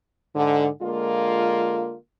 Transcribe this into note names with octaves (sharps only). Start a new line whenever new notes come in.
G#2 D3
D3 G#3 A#3 F4